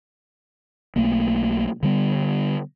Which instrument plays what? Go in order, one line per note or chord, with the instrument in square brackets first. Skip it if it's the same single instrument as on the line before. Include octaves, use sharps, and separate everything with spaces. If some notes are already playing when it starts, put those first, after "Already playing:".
[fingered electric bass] B1 A3 A#3
D3 G3 B3